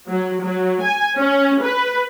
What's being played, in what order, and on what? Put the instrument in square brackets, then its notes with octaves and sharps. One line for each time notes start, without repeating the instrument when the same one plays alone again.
[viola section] F#3
F#3
G#5
C#4
B4